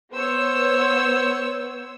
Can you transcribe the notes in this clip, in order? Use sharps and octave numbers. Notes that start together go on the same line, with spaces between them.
B3 C5 C#5 E6